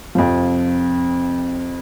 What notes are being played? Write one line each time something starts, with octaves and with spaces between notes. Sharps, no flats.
F2 C3 F3